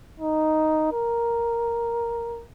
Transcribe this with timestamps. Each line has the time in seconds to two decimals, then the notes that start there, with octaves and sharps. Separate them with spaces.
0.20 D#4
0.93 A#4